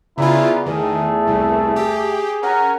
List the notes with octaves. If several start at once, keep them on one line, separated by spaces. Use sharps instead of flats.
C#3 B3 E4 F4 G#4 D5 A#5
E2 D#3 A3 G#4
C2
G4
C#4 A#4 F#5